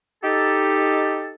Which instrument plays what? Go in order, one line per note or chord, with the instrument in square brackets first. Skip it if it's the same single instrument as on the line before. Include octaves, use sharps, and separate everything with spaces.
[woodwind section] D#4 A4 [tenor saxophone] G4